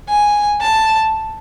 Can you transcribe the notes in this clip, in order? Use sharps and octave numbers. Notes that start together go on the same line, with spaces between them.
G#5
A5